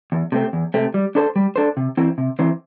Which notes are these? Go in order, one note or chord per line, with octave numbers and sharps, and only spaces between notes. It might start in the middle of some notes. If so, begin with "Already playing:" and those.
E2
C3 A3 C4
E2
C3 A3 C4
G3
D4 A4 C5
G3
D4 A4 C5
C3
E3 C4 E4 C5
C3
E3 C4 E4 C5